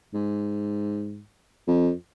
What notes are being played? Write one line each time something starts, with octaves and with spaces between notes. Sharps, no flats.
G#2
F2